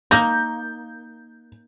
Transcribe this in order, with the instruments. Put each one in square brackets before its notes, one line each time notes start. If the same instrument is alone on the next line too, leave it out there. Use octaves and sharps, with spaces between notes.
[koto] A#3 D#4 A#4 [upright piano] G6